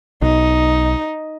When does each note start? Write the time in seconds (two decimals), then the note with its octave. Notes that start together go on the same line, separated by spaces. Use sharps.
0.22 B1 D#4